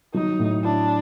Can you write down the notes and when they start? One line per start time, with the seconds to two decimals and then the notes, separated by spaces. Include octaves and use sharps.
0.14 F#3 D#4
0.39 A2
0.64 D4 E4